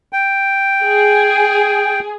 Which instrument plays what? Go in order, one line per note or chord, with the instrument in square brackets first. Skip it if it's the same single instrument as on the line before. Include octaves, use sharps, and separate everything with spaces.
[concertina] G5
[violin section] G#4